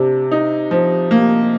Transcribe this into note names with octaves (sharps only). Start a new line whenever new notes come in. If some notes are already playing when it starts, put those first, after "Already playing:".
Already playing: C3 D4
D#4
F3
A#3